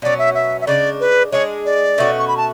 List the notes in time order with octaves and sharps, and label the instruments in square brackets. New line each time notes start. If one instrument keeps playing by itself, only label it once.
[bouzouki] B2 F#3 C#4 [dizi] D5
[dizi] E5
E5
E5
[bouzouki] C#3 G#3 D4 [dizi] D5
[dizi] B4
[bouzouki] G#3 D4 G#4 [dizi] C#5
[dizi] D5
[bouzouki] B2 A3 C#4 F#4
[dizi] C#6
B5
A5